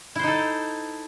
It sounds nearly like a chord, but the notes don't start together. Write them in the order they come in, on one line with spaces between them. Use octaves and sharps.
E4 C5 D#4 A4